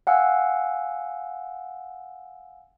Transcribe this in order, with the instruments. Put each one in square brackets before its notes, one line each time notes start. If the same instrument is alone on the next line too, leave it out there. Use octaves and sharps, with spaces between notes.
[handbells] F5 F#5 G#5 E6